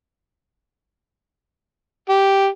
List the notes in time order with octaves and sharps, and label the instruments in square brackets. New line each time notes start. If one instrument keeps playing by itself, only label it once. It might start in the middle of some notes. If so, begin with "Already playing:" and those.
[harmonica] G4